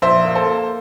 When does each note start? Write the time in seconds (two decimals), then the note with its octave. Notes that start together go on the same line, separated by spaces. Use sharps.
0.02 A#1 C5 E5
0.25 A#3
0.35 A4 C5
0.46 A#3